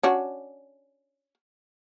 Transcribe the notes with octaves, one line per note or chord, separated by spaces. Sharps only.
C#4 D4 F#4